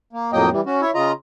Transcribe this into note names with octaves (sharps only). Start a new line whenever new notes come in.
A#3
F2 A2 F#3 A#3 D#5 G5
E3 G3
C#4 F#4
E4 C#5 E5
C#3 F4 D#5 A#5